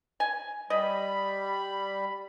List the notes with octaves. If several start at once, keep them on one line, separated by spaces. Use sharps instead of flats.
G#5
G3 D#5 B5